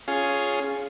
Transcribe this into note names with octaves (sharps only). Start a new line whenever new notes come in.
C#4 F4 G#4